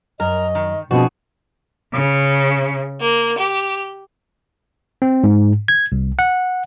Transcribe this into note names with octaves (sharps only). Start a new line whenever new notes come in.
F#2 A#4 D#5
D#3
B2 F3 C4 D4 F#4 G#4
C#3
A#3
G4
C4
G#2
G#6
C2
F#5